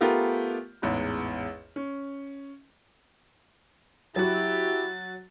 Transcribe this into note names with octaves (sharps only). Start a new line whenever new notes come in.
A3 B3 F4 G4 A#4
A1 E2 G#2
C#4
F#3 E4 F#4 G4 A6